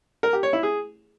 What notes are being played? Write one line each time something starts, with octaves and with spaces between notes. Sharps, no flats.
A#4
G4
C#5
E4
G#4